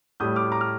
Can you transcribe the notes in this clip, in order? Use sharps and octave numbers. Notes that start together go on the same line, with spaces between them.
A2 G3 D#6 G6
D6 F6
A#5 D6
F6